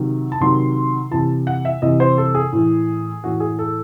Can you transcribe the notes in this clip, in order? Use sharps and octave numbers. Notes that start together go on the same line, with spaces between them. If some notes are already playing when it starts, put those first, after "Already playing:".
Already playing: C3 D#3 F#3
A5
C3 D#3 F#3 C6
C3 E3 A5
F#5
E5
C3 E3 D#5
C5
A4
G#4
A2 E3
A2 E3 F#4
G#4
A4